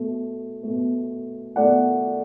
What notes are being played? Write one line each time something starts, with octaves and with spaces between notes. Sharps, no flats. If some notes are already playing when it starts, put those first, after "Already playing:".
Already playing: B2 A3
A3
B2
B2 A3 D5 F#5